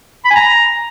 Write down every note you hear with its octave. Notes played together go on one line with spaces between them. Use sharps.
B5
G#5
A#5